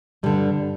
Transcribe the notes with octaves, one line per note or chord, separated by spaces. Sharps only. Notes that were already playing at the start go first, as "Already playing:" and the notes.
G2 D3 G3